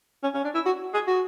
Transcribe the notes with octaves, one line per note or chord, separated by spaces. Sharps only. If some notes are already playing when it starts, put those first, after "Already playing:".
C#4
C#4
D4
E4
F#4
G#4
F#4